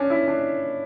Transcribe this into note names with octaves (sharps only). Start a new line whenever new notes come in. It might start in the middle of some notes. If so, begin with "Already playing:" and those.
Already playing: C#4 D4
E4
D4